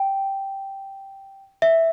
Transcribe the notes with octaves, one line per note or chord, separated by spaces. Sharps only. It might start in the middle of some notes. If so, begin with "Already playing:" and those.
Already playing: G5
E5